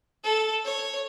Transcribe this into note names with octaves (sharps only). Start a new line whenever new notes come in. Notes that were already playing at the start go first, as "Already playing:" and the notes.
A4
C#5